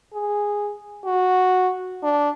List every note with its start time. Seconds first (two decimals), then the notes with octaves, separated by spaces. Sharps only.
0.13 G#4
1.05 F#4
2.03 D4